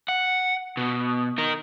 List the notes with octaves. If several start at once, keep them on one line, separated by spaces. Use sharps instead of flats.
F#5
B2
D#4 A#4